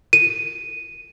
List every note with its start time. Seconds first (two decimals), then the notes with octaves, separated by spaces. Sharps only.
0.13 D#7